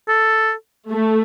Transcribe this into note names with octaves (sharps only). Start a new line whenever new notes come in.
A4
A3